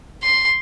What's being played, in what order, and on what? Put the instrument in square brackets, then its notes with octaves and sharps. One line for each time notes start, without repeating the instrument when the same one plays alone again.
[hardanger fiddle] C6